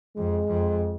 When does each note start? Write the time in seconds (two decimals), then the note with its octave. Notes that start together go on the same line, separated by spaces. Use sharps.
0.17 F2 G#3
0.48 F2